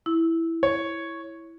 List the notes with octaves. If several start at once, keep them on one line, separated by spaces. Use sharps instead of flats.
E4
C#5